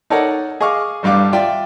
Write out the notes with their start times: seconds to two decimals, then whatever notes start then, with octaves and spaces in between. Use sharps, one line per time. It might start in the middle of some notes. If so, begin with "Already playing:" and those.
0.10 D#4 A4 A#4 C#5 D5 F#5
0.61 G#4 D#5 F5 C#6 D6 F6
1.03 A1 G2 G3 F5 D6
1.33 F4 D5 E5 G5